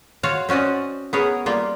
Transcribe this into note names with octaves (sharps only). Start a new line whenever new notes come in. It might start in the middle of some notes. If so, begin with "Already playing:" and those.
F4 F#4 C#5 F5
C4 C#4 F#4 D5 D#5
B3 G#4 A#4 C#5
G3 A#3 F4